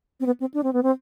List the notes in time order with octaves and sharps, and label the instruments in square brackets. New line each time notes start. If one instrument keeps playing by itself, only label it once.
[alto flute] C4
B3
C4
D4
C4
B3
C4